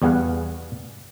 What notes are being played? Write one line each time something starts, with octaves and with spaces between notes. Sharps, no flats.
E2 G3 B3 G#4 F5 F#5